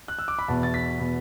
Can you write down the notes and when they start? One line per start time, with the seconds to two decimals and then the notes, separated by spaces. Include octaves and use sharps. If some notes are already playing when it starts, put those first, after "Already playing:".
0.08 F#6
0.19 E6
0.28 D6
0.39 B5
0.48 E2 B2 B3 A5
0.63 A6
0.74 B6
0.99 B2 B3